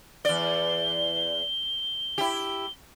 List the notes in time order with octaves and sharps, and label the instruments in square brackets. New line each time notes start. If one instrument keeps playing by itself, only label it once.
[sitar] E2 D5 [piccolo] G7
[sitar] E4 G4